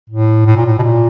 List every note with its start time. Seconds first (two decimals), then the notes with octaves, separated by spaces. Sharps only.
0.10 A2
0.46 A2
0.56 A#2
0.66 A2
0.79 B2
0.82 A#2